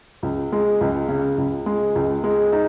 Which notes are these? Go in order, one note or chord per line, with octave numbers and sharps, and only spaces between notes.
C#2
G#3
C#2
C#3
C#2
G#3
C#2
G#3
D#4